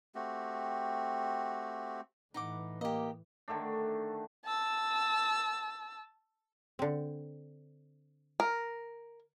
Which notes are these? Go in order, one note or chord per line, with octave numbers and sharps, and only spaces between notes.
A3 C4 F#4 G4
A2 E3 D#4 F#5 D6
A#3 G4 D#5
D3 D#3 A3 D4
A5 E6
D3 C4
A#4